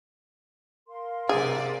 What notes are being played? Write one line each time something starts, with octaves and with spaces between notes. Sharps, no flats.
A#4 F5 C6
C3 G#4 D5